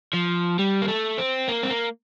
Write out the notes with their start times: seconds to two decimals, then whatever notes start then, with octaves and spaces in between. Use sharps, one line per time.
0.13 F3
0.59 G3
0.82 A#3
0.88 A3
1.18 C4
1.48 A#3
1.63 C4
1.70 A#3